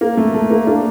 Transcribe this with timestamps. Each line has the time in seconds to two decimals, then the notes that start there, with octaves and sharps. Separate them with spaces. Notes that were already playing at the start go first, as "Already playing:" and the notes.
0.01 A#3
0.17 A3
0.34 A3
0.51 A#3
0.67 A#3 D4